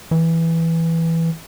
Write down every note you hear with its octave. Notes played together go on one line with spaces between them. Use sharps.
E3